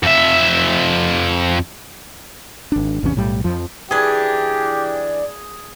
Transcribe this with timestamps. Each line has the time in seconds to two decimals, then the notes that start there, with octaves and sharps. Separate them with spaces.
0.03 F2 E5
2.72 G#1 D4
3.03 G#1 E2 C3 C#4
3.15 B1 A2 G3
3.44 F2 F3
3.91 E3 D4 G4 G#4 G#5